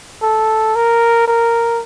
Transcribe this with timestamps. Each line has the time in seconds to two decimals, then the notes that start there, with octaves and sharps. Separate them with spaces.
0.22 A4
0.75 A#4
1.28 A#4